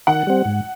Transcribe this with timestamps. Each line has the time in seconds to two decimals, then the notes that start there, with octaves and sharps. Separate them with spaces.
0.07 D#3 F#5
0.27 G3 C4
0.45 G#2